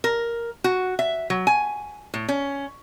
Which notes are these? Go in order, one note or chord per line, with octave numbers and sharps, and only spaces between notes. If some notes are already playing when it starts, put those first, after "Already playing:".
A#4
F#4
E5
F#3
G#5
A2
C#4